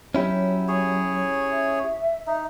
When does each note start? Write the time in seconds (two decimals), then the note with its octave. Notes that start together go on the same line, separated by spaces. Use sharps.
0.15 F#3 C#4 E4 G4
0.68 G#4 C#5
1.51 E5
2.27 D#4